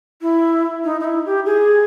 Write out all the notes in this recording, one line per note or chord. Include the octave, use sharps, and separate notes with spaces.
E4
D#4
D#4
E4
G4
G#4